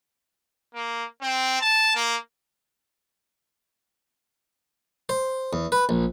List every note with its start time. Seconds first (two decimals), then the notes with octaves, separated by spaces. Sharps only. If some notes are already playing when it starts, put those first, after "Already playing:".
0.74 A#3
1.22 C4
1.61 A5
1.95 A#3
5.09 C5
5.53 E2
5.72 B4
5.89 A#1